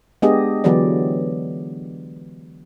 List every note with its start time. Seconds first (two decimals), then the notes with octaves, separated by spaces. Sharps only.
0.22 G#3 B3 D4 G4 G#4 D#5
0.64 D3 E3 F#3 B3 G4 D5